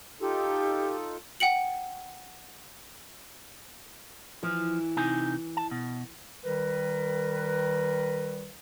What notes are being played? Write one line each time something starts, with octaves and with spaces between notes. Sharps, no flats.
D#4 F4 G4 A4
F#5 G5 C#7 F#7
E3 F3
C3 D#4 G#5
A5
B2
D#3 G3 A#4 B4